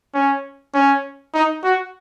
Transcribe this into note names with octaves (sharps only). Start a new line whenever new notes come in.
C#4
C#4
D#4
F#4